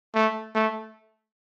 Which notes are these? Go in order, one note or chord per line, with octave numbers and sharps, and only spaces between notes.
A3
A3